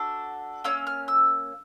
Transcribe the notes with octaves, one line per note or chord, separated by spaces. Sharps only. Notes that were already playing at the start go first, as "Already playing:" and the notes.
Already playing: D4 F#4 A4
A#3 C#4 E6
F6
E6